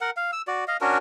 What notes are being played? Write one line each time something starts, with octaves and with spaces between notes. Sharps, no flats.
A#4 F#5
F5
E6
F#4 D5
D#5 F5
C#4 D4 F#4 A#4